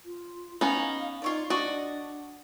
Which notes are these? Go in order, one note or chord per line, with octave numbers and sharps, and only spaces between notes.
F4
B3 C#4 D#4 F5
D#4 F4 C#5 D5
D4 F#4 D5 D#5 C#6